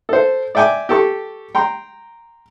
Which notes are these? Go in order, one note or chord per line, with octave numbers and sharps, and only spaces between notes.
A4 C5
D5 E5 G5 G#5 D6
G4 A4 C#6
G5 A#5 C6